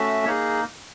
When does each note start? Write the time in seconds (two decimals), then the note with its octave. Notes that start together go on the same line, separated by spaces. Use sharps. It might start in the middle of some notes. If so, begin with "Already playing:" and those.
Already playing: A3 C#4 F#4 E5
0.26 A#3 D#4 G#4 C#5